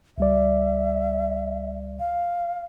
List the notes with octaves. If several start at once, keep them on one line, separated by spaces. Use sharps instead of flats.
C#2 G3 D5 E5
F5